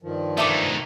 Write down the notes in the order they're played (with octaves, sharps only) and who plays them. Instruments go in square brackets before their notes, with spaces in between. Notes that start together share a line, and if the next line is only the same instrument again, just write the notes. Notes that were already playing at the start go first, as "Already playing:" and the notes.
[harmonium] G2 D#3 F3
[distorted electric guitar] A3 D#4 [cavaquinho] E5 A5 D6